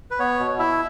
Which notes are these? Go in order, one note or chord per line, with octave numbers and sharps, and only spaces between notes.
B4
B3 C#5
B2
E4 E5